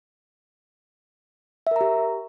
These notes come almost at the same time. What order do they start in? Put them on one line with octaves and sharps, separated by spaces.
E5 A#4 A#5 G4